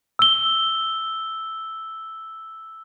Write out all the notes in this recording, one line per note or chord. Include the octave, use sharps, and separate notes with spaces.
E6 G7